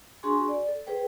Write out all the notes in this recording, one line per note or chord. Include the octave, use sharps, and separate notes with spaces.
D4 F#4 G#4 G#5 C6 C#6
D5
A4
G#4 B4 C5 G5